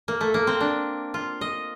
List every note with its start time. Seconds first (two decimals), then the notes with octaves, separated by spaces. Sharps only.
0.08 A#3
0.21 A3
0.34 A#3
0.47 C4
0.61 D4
1.14 F4
1.41 D#5